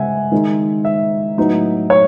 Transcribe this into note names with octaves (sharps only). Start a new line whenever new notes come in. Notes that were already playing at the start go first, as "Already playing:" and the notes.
Already playing: C#3 G#3 E5 F#5 G#5
D#3 G#3 D#4
E5
A2 F#3 B3 D#4
C#5